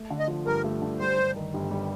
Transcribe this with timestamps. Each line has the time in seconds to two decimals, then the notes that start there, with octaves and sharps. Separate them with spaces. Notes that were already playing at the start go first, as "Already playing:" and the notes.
Already playing: A3
0.10 D3
0.19 D#5
0.28 F3
0.46 G2 A#4
0.64 A3
0.82 D3
0.99 G3 C5
1.18 G2
1.36 D#3
1.54 G1
1.71 G3